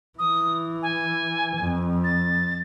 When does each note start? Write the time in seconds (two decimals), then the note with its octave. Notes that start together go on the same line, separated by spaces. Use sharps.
0.19 E3 D#6
0.82 G#5
1.57 F2
2.04 A6